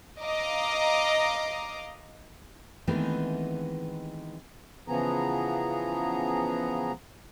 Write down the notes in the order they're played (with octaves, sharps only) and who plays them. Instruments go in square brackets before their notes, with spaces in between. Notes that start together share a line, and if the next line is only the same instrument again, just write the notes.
[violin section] D#5 F5 A#5 D6
[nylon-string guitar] D#3 E3 G#3 A3 B3 C4
[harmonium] C#3 E3 F3 B3 G#4 A#5